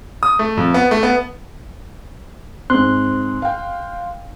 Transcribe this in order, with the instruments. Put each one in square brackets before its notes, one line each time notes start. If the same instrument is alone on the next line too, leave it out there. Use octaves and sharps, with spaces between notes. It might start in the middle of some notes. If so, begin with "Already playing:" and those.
[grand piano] D#6
A3
F2
B3
A3
B3
[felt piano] G#2 C4 [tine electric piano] C6 F#6
[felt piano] F5 G5